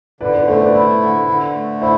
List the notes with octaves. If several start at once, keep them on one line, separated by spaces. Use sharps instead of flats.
D3 B4 D5
B4 D5
A3 A4 C5
B4 D5
E4 B4 D5
D3
D3
A3
E4 C5 E5